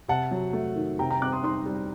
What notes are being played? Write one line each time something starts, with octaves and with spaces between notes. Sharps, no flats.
C3 F#5 A5
F#3
A3
D#3
C3 G5 A#5
G5 A#5
C4 D6 F#6
C6 D#6
D#4 C6 D#6
G3